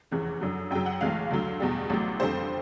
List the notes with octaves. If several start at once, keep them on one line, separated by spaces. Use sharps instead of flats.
F1 E2 C#3 E3
F#2 D3 F#3
F#2 C#3 F#3 G5
F#5
B1 A2 E3 G#3 F5
D2 D3 F#3
E2 B2 G3
A1 A2 F#3
F2 D3 G3 C5